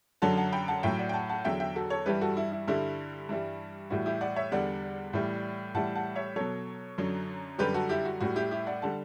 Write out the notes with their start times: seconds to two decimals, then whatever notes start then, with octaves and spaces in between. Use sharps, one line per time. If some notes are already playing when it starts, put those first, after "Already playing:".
0.22 F#2 D3 F#3 F#5 A5
0.37 F#5 A5
0.52 G5 B5
0.68 F#5 A5
0.83 A2 F#3 E5 G5
0.98 D5 F#5
1.09 G5
1.14 F#5 A5
1.29 F#5 A5
1.45 E2 D3 F#3 E5 G5
1.60 E5 G5
1.76 F#4 A4
1.90 A4 C#5
2.06 G2 E3 G3 G4 B4
2.21 F#4 A4
2.37 E4
2.52 E4
2.67 G2 D3 G3 E4
3.29 G2 E3 G3
3.90 A2 E3 G3 F#4
4.06 E4 G4
4.21 D5 F#5
4.36 C#5 E5
4.51 E2 D3 G3 D5 F#5
5.13 A2 E3 G3
5.75 A2 E3 G3 F#5 A5
5.95 F#5 A5
6.15 C#5 E5
6.36 B2 F#3 A4 C#5
6.98 F#2 D3 F#3
7.59 F#2 D3 G3 G4 B4
7.74 F#4 A4
7.89 E4 G4
8.05 F#4
8.20 A2 G3 F#4
8.36 E4 G4
8.51 E4 G4
8.67 D5 F#5
8.82 D3 G3 F#5 A5